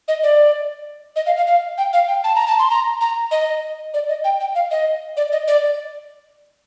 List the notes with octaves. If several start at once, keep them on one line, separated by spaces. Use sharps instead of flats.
D#5
D5
D#5
F5
F5
F5
G5
F5
G5
A5
A#5
A5
C6
A#5
A#5
D#5
D5
D#5
G5
G5
F5
D#5
D5
D#5
D5